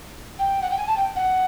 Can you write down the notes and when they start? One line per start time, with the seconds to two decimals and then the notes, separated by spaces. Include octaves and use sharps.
0.39 G5
0.62 F#5
0.70 G5
0.77 G#5
0.87 A5
0.96 G5
1.16 F#5